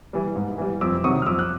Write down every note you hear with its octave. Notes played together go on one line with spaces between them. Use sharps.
E3 G3
G#2
E3 G3
F2 D6 E6
C3 D#3 F#3 C#6 D#6
F6
F2 D6 E6
F#6